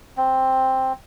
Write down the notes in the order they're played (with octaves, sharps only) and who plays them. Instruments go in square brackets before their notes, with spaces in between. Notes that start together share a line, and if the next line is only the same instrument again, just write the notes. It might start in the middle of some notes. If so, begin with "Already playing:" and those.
[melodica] C4